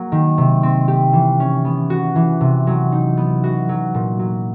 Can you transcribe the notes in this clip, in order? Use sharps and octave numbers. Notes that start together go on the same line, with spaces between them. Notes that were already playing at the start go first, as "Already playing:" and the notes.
Already playing: F#3 A#3
D#3
C3
C4
G4
E3
C#4
B3
F#4
E3
C3
F#3
D#4
B3
F#4
F#3
A#2
F#3